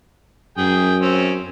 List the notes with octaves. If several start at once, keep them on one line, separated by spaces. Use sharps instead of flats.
F#2 G#4 G5
C4 C#4